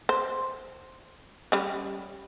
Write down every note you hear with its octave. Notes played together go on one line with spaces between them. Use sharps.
C5
G3 C#4